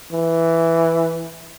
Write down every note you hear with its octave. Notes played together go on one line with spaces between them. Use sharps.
E3